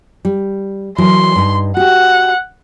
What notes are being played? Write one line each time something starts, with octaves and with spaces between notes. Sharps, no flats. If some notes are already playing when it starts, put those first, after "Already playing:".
G3
E3 F#3 A#4 C6
G2 D#4
F#4 G4 F#5